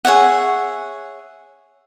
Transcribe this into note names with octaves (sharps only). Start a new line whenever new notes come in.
G#4 C#5 E5 F#5